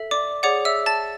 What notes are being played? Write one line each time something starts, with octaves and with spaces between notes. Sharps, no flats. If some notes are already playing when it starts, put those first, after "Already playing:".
Already playing: A4 E5
D5 D6
G#4 C#5 D5 F#5 D6
E5 E6
A5 A6